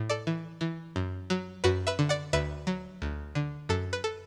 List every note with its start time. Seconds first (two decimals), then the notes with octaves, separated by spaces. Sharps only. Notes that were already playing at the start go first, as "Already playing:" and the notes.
Already playing: A2
0.10 A4 D5
0.27 E3
0.61 E3
0.96 F#2
1.30 F#3
1.64 F#2 F#4 B4
1.87 B4 E5
1.99 D3
2.09 D5 F#5
2.33 D2 B4 E5
2.67 F#3
3.02 D2
3.35 D3
3.69 F#2 A4
3.93 B4
4.04 A4